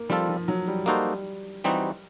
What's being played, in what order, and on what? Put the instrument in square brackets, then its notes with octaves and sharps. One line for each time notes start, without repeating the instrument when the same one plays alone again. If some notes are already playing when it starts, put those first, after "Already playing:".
Already playing: [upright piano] A#3
[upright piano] F3 [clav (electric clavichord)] G3 C4 F4 A4
[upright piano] F3
F#3
G3
[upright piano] G3 [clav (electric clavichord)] A#3 D#4 F#4 A4 C5
[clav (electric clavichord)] E3 G3 C4 D#4 F#4